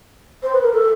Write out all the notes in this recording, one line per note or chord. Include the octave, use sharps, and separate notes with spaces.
C5
B4
A#4
A4